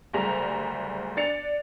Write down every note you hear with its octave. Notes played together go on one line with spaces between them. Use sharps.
F#1 D2 G3 G#4 A#5
D4 A6 C#7 F7